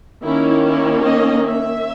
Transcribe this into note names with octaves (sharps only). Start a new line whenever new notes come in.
D#3 A#3 C#4 E4
E4
D#5
E5